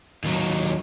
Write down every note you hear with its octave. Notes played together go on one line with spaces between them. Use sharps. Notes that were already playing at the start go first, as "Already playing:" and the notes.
D#2 F#3